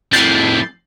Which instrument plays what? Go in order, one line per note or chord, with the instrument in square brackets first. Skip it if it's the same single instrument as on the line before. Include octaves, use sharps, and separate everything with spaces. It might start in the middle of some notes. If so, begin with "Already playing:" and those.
[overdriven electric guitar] F2 A2 [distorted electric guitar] E4 A#4 [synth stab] G6 A6 C7